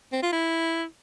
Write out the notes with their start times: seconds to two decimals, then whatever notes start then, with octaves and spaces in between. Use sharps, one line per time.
0.12 C4
0.22 F4
0.33 E4